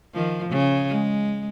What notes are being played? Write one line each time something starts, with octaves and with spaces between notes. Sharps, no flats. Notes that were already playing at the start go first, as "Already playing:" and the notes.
D#3 F3
C#3
G#3